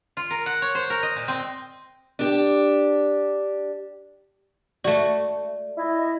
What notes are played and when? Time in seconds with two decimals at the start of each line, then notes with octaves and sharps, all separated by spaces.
0.17 F4
0.30 A#4
0.46 F#5
0.62 C#5
0.75 C5
0.90 A#4
1.03 D#5
1.16 A#2
1.28 C4
2.19 D4 G4
4.84 A3 F#4 D5
5.77 E4 D#5